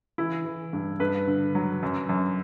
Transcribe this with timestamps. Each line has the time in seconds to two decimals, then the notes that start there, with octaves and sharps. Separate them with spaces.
0.18 E3 E4
0.45 E3
0.73 G2
1.00 G2 B4
1.27 D3
1.55 F#3
1.83 F#2
2.09 F#2